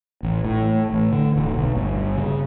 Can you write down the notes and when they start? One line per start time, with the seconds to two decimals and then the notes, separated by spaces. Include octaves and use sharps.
0.23 A1
0.45 A2
0.92 A1
1.12 D3
1.35 D1
1.54 B1
1.75 G1
2.17 C#3